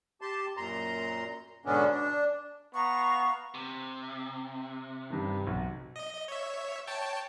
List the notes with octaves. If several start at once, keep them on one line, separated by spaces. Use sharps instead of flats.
G4 A5 C6
F#2 A#2 A#5 C6
G#2 B2 D3 B3 C#4 D4
D4
B3 F5 A#5 C#6
C3
G2 D#3
B1
D#5
C#5 E5
C#5 G5 A5